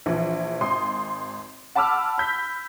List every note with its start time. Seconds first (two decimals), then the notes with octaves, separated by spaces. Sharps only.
0.06 A#1 E3 F3
0.61 G#1 C6 D#6
1.75 F#5 A5 B5 D6 E6 F6
2.18 B5 G6 B6